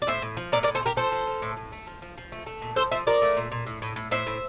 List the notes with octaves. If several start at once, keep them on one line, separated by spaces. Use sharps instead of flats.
D5
A2 C5 E5
A2
F3
A2 A#4 D5
A#4 D5
A2
A4 C5
A3
G4 A#4
F3 A4 C5
F3
F3
A2
A2
A3
F3
F3
F3
A3
A3
A#2
F3 A4 C5
F3 C5 E5
F3 A#4 D5
A3
A#2
A#2
A2
A2
A2
A2 C5 E5
A2